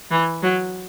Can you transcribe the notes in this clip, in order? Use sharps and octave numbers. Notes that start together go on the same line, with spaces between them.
E3
F#3